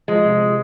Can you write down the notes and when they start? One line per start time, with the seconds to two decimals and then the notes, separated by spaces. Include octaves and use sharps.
0.08 F3 G#3
0.25 C3